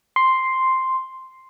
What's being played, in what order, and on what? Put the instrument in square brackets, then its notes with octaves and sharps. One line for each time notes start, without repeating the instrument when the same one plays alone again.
[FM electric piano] C6